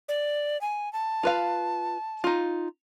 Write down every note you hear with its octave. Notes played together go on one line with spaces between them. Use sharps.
D5
G#5
A5
F4 B4 F5
D#4 F4